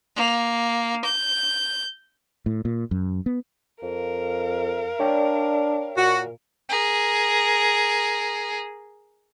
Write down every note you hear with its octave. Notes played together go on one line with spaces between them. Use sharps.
A#3
G6
A2
A#2
F#2
B3
F2 A#4 F5
D4 C#5 D5 G5
A#2 F#4
G#4 A#4